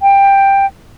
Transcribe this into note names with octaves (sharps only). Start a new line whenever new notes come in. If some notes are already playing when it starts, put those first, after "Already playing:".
G5